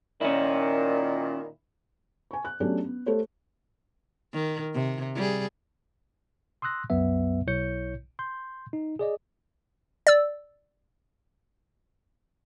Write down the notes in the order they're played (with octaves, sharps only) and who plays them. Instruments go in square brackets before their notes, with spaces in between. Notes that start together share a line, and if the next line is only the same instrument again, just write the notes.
[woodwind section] A#2 D#3 [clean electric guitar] C#4 E4
[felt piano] G#5 C#6
F#6
F#3 A3 B3 C#4 D4 G4
B3
A3 G4 A4 C5 C#5
[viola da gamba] D#3
C3
G3 G#4
[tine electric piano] C6 D#6 E6 F#6 A#6
C2 F#2 F#3 B3 E5
B1 E4 C#5 G6 C#7
C6 G6
D#4
G#4 D5 D#5
[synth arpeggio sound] D5 E6